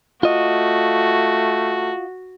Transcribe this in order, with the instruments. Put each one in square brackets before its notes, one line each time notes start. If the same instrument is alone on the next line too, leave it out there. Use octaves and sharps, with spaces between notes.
[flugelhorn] A3 [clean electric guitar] F4 D#5 [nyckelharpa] F#4